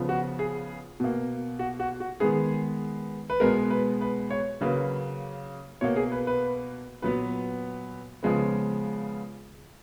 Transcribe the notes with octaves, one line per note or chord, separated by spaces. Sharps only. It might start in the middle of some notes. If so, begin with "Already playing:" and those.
Already playing: C#3 F3 B3
F#4
G#4
B2 A#3
F#4
F#4
F#4
D#3 G#3 B3 G#4
B4
B2 G#3 B3 A#4
B4
B4
C#5
C#3 F#3 A#3 B4
B2 A#3 C#5
G#4
B4
B4
A#2 F#3 B3 B4
C#3 F3 G#3 B3